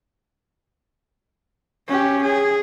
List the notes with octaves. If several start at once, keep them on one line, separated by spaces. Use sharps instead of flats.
C#4 G4
G#4